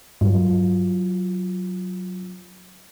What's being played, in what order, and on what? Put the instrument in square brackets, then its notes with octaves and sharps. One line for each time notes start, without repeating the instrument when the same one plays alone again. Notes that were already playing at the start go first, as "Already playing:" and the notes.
[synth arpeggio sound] G2 [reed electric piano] F#3 F4